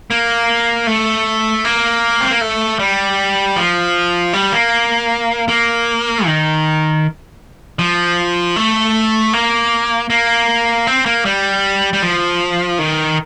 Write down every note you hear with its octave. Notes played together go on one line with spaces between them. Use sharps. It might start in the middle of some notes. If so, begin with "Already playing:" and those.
A#3
A3
A#3
C4
A#3
A3
G3
F3
G3
A#3
A#3
D#3
F3
A3
A#3
A#3
C4
A#3
G3
G3
F3
D#3